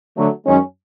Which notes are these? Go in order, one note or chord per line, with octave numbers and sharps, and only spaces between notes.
D3 F#3 A3
F#2 D#3 G#3 C#4